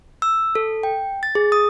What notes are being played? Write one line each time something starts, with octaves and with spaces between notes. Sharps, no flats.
E6
A4
G5
A6
G#4
D#6